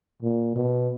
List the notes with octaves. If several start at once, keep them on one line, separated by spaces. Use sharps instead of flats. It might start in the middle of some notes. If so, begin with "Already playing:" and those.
A#2
B2